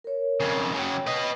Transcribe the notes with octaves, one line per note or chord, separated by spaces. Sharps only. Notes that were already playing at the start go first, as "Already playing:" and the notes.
A#4 C#5
F2 C#3
C#3 F#3 C#5 G5
B4 D#5